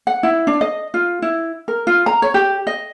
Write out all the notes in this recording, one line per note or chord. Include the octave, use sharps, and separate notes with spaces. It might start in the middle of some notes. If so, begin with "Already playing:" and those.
F#5
E4
D4
D#5
F4
E4
A#4
F4
A#5
C#5
G4
D#5